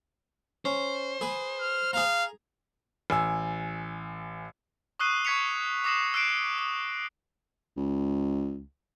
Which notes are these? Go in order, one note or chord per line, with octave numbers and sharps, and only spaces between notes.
C#4 C5
G#4 B4
F6
G#4 F5 A#5
A1 G#5 E6
C#6 D#6 E6 F#6 C7 D#7
C#6 G#6 B6 C#7 F7
D6 D#6 A#6 C7 E7 F#7
E6 F#6 C7 D7 E7
D#6
C#2